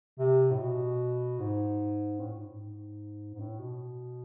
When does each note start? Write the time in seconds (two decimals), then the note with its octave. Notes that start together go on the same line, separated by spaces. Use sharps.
0.19 C3
0.51 A2
0.59 B2
1.40 G#2
2.20 A2
2.33 G#2
2.46 G#2
3.34 G#2
3.40 A2
3.60 B2